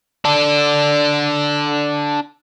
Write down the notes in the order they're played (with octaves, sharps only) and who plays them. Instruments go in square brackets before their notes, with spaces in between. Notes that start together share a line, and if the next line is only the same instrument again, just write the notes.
[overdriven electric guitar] D4 A4